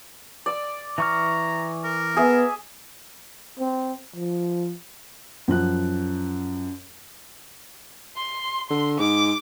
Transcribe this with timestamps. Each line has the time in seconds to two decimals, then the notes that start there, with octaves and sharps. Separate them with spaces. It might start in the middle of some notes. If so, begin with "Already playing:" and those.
0.46 D5 E6
0.98 E3 A#5 C#6 F6
1.85 A#4
2.17 B3 G#4 E5
3.59 C4
4.16 F3
5.48 F#2 F3 F#6
8.16 C6
8.70 D3 C6
8.99 G#2 D6